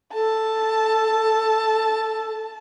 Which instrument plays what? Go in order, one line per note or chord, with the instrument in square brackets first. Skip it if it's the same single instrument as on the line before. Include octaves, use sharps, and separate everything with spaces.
[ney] A4 [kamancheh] A5